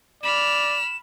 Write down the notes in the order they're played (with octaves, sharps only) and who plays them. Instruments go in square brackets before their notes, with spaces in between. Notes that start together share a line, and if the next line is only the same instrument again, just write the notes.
[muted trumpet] D5 [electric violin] B5 F6 [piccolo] E7